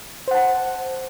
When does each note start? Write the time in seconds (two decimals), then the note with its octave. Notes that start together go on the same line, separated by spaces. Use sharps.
0.28 C5
0.31 F#5
0.35 A5